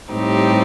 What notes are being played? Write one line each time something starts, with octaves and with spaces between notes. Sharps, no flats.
A2 G3 C4 D#4 G4